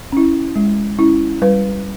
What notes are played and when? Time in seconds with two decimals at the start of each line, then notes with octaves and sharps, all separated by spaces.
0.12 C#4 E4
0.56 G#3
0.99 C#4 E4
1.42 G3 B4